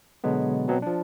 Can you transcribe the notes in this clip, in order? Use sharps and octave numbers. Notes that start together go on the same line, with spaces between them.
B2 D3 F#3 G#3 B3
B2 F#3 B3 C4
F3 D4